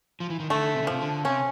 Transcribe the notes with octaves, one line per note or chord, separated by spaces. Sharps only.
F3
E3
D#3
D3 A3
C3
C#3
C3 F3
D3
C3 C#4